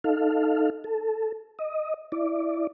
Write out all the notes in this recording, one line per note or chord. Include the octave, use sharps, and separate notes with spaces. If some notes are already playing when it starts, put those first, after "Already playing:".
D#4 A4 F5
A4
D#5
E4 D5